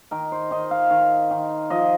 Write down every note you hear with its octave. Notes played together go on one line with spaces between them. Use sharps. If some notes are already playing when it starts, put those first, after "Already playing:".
D#3 A#4
C5
D#3 D#5
F5
D#3
D#3
F3 D#5